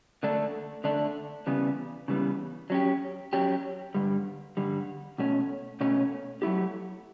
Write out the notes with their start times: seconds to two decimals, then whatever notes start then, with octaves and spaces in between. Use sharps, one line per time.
0.23 D3 A3 D4
0.84 D3 A3 D4
1.47 C#3 E3 G3 B3
2.08 C#3 E3 G3 B3
2.70 F#3 C#4 G4
3.33 F#3 C#4 G4
3.95 G2 D3 G3
4.57 G2 D3 G3
5.18 B2 A3 C#4
5.81 B2 A3 C#4
6.42 F#3 A3 E4 G4